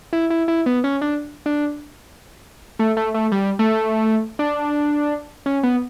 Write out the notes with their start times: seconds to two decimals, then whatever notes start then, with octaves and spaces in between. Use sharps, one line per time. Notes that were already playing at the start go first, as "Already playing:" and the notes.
0.13 E4
0.30 E4
0.48 E4
0.66 B3
0.84 C#4
1.01 D4
1.46 D4
2.79 A3
2.97 A3
3.14 A3
3.32 G3
3.59 A3
4.39 D4
5.46 C#4
5.63 B3